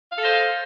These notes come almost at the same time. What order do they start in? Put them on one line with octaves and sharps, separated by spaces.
F5 A4 D#5 C5